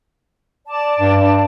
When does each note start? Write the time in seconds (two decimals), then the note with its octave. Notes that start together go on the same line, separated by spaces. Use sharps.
0.67 D5 A5
0.99 G2